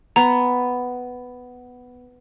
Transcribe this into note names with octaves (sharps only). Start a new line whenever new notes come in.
B3 A#5